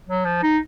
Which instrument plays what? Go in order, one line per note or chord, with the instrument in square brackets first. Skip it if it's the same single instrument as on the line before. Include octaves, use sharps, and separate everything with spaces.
[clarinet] F#3
F3
D#4